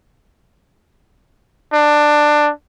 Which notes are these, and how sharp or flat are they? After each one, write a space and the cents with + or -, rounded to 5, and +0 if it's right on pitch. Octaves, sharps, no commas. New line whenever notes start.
D4 +15